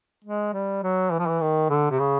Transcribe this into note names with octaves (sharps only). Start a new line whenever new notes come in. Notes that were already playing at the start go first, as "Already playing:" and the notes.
G#3
G3
F#3
E3
F3
E3
D#3
D3
C3
C#3